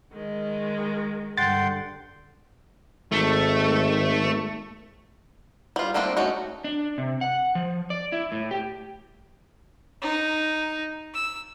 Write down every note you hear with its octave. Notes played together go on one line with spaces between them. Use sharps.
D#3 G#3
G2 D3 F#5 G5 C6 A6
G#1 A3
G3 F4
G3 A3 A#3 C4 D4
A3 C#4 D#4 F#4
D4
C3
F#5
F3
D5
E4
A2
G4
D#4
E6